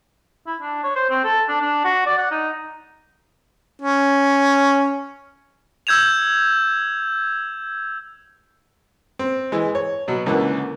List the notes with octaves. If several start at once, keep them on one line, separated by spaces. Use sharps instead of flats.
E4
D4
C#5
C5
C4
A4
D4
D4
F#4
D5
F#5
D#4
C#4
E6 G6 G#6 E7 F7
C4
E3 G#3
C#5
B2 F#3
C#2 D3 E3 A#3 F#5